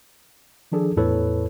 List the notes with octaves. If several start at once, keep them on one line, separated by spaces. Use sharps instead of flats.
D#3 F3 D4 G#4 A4
E2 A2 E4 A4 B4 C#5